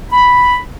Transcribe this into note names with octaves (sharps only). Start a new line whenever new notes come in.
B5